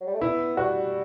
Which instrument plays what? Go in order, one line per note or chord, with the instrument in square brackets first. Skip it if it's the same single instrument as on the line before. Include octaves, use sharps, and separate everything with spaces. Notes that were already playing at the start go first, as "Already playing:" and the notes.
[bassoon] F#3
G3
A3
[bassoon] B3 [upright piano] E4
[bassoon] G3 [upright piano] F#4